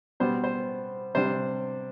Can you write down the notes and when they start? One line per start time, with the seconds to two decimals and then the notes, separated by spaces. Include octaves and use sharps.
0.20 B2 G3 B3 C5
0.44 C5
1.15 C3 G3 D4 C5